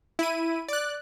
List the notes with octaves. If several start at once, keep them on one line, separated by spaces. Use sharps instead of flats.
E4 D#7
D5 F#6